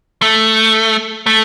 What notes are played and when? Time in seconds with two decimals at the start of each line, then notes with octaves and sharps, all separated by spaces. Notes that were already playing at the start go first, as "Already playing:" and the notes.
0.22 A3
1.26 A3